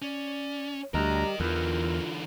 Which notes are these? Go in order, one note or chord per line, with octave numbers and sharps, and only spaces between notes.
C#4 D5
D2 G3 A#4 D#5 A#5
E2 D3 E3 F4 A#4